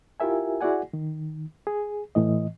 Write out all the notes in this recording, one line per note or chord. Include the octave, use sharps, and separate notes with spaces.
E4 F4 G4 A#4 E5 G#5
E4 F#4 G#4 D5 F#5 G#5
D#3
G#4
A2 E3 D#5